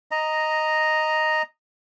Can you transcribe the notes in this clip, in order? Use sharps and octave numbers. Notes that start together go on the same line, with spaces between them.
D#5 A#5